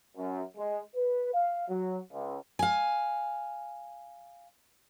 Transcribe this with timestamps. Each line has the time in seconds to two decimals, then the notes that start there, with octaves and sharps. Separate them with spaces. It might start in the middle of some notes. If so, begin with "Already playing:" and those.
0.17 F#2
0.56 G#3
0.95 B4
1.33 F5
1.68 F#3
2.12 C#2
2.59 F5 G#5